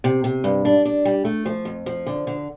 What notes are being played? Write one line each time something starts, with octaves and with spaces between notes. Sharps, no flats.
C3
C3
G2
D4
D4
G3
A3
F3
F2
F3
D3
D3